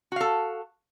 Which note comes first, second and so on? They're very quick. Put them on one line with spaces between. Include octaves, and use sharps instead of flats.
F#4 F5 A4